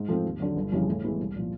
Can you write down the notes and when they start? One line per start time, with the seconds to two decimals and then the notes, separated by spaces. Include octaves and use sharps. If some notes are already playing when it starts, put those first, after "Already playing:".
Already playing: G#2
0.09 F3 A3 C4
0.25 D#2
0.40 D3 F#3
0.56 G1
0.72 F2 C#3 E3 G3
0.88 A2
1.04 E3 G#3 B3 E4
1.20 C2
1.35 A#2 F3